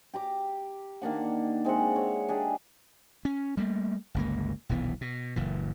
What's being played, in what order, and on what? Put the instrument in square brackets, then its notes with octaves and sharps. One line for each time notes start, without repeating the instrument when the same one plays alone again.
[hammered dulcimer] G4 A#5 D6
D#3 A#3 D4 F#5
G#3 C4 E5 F#5
C#5
D4 G4 G#4
[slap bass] C#4
G3 A3 A#3
G1 C#2 A#3
D#1 B1 E3 B3
B2
F#1 A#2 E3